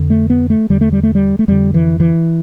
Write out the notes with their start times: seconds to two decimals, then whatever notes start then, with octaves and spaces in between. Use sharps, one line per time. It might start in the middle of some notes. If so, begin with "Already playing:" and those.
Already playing: F2 D3
0.10 A3
0.30 B3
0.50 A3
0.70 E2 D3 G3
0.81 A3
0.93 G3
1.03 A3
1.15 G3
1.39 A3
1.48 F2 D3 G3
1.74 E3
2.00 E3